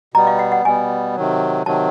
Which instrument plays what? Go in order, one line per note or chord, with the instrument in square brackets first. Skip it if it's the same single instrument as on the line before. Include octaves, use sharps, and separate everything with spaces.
[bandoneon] B2 G3 B3 [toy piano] A#5
[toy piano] F5
F#5
F#5
[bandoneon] B2 G3 B3 [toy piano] G#5
[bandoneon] C3 D#3 F#3
[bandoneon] C3 D#3 F#3 [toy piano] A5